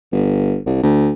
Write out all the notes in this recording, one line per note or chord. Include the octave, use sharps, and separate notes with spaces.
G1
C2
D2